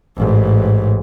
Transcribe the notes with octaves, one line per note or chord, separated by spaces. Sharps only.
A1 G#2